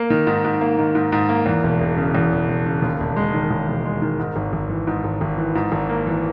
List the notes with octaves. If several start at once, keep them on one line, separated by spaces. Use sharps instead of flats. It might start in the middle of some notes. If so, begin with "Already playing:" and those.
Already playing: A#3
D#3
G#2
G#2
A#3
D#3
G#2
G#2
A#3
E2
E1
E1
C#3
E2
E1
E1
C#3
D#2
E1
G#3
D#3
D#2
E1
G#3
D#3
G#2
G#1
G#1
E3
G#2
G#1
G#1
E3
G#2
G#1
A#3
E3